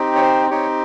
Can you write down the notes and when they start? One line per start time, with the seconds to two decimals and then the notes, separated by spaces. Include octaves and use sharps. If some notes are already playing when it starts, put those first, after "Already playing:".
Already playing: C4 D#4 G4
0.16 C#5
0.22 C5
0.50 C4 D#4 G4 C#5